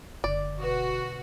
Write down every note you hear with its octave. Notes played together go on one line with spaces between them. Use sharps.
F#1 D3 D5
B2 F#4 B4